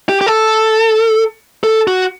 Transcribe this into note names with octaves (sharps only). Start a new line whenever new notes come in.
G4
G4
A4
A4
F#4